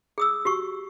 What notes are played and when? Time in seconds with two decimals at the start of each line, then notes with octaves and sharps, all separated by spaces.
0.18 G#4 D#6 E6
0.45 F#4 G4 C#6